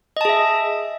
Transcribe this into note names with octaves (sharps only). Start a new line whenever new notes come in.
G#4 D#5 E5 A5